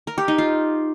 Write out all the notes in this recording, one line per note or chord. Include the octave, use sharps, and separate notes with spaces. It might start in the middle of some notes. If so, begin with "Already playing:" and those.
A#4
G4
D#4
F4